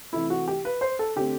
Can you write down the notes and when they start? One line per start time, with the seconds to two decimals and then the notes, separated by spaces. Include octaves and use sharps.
0.13 C3 E3 A3 E4
0.30 F#4
0.48 G4
0.65 B4
0.81 C5
0.99 A4
1.16 D3 A3 C4 G4